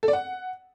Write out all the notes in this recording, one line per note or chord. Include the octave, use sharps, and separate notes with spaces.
A4
D5
F#5